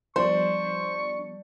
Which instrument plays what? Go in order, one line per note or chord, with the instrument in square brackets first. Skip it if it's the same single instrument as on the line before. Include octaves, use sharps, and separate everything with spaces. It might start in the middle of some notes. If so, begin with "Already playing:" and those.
[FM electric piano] F3 G3 B3 [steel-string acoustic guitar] D4 [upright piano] C5 [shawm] C#6